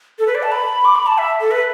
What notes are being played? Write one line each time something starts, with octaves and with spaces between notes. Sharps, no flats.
A4
B4
D5
A5
B5
D6
B5
A5
E5
A4
B4